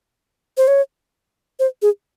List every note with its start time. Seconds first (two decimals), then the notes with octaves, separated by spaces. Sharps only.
0.57 C5
0.68 C#5
1.60 C5
1.82 G#4